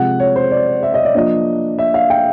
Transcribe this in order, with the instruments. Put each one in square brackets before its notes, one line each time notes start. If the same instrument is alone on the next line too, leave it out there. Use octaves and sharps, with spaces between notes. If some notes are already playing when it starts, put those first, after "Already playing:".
Already playing: [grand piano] C3 F3 G#3 F#5
C#5
C5
D5
E5
D#5
D5
F3 A#3 D4 D#5
E5
F5
G5